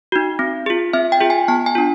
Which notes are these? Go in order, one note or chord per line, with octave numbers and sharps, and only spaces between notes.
D#4 F#4
C4
F4 G#4
C4 E5
G5
F4 G#4
G#5
B3 A5
G#5
D4 F4